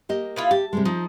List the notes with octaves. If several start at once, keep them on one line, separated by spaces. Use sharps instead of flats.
A#3 G4 D#5
B3 E4 F4
G4 A5
C3 G3 G#3
F3 D#4